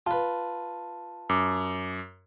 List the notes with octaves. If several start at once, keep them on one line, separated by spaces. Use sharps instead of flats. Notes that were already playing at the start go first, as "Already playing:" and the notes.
F4 B4 A5
F#2 D6